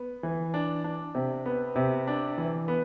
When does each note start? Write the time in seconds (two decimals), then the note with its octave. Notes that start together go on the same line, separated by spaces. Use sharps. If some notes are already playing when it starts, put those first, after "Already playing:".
Already playing: B3
0.23 E3
0.54 D4
0.84 D4
1.15 C3
1.46 B3
1.76 C3
2.07 D4
2.38 E3
2.68 B3